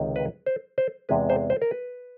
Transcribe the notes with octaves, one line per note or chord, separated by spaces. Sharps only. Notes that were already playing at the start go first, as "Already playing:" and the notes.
Already playing: C#2 C3 D#3
B4
C5
C5
E2 C3 E3 G#3 B4
C5
C5
A#4
B4